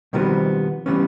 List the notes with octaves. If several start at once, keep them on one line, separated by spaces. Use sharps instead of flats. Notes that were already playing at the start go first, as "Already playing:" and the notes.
B2 D#3 F3 G3 B3 C4
E3 F3 G3 A3 B3 C#4